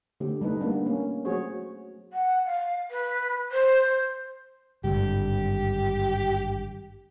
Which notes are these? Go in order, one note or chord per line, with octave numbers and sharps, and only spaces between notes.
D3 A3 G4
G3 A3 D#4 B4
A#3 B3 D4
A#3 C#4
F#3 A3 F#4 G#4 C5 C#5
F#5
F5
B4
C5
G#1 G2 D3 G4